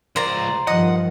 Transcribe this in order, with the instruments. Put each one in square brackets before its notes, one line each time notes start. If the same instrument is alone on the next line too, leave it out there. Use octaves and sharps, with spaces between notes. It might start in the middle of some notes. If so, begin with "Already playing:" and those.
[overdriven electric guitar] C#2 D5 [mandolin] C5 A#5
[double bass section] G2 D#3 F3 [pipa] D#5 [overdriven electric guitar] F#5